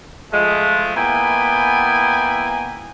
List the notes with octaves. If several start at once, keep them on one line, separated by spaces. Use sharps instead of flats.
F3 G#3 A3
A#3 B3 E4 G5 G#5